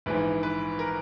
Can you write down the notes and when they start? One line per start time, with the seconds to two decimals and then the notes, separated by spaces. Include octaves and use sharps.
0.06 A#1 G#2 E3 B4
0.43 B4
0.79 A#4